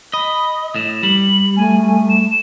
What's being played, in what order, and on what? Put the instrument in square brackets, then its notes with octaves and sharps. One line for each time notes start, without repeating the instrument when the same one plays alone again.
[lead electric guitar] D#5 [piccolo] B5
[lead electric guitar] A2 [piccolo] E7
[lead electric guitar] G3 [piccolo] F#7
[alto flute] A3 [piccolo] G#5
[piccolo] G#5
E7